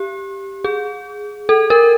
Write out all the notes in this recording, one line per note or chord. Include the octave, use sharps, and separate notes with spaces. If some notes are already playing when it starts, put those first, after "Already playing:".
Already playing: G4
G#4
A4
A#4